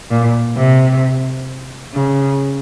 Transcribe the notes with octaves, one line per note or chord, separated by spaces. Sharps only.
A#2
C3
C#3